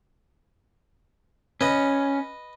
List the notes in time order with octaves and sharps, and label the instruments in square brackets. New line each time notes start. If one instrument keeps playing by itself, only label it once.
[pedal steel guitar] C#4 [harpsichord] B4 D#5